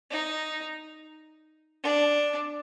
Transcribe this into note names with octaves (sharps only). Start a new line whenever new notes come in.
D#4
D4